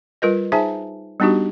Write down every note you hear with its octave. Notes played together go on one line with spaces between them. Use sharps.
G3 F4 A#4 B4 D#5
D#4 G#4 C5 E5 G#5 A5
G3 B3 D4 D#4 F#4 G4